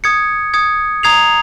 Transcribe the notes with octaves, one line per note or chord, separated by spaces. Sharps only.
D#6 G#6 C#7
D#6 G#6 C#7
A#5 D#6 G#6 C7 F7